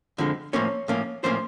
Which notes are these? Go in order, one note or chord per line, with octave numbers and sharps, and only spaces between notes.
F2 D3 F3 G#3
A2 F3 A#3 C#4 C#5
A2 F3 A#3 C#4
A2 F3 A#3 C#4 C5